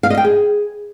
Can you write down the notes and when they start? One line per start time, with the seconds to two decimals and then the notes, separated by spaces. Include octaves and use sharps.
0.03 F5
0.10 D#5
0.17 G5
0.25 G#4